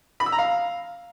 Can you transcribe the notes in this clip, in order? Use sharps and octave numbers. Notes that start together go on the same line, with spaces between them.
B5
E6
A#5
F5